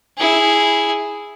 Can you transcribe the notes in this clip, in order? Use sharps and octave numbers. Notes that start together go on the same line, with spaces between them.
E4 G#4